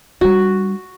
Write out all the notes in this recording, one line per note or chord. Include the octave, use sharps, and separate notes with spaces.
G3 D4 F#4